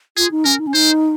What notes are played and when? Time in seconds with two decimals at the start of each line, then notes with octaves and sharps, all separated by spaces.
0.17 F4 G#4
0.31 D#4
0.45 C#4 A#4
0.59 D#4
0.67 C#4
0.74 D#4 C5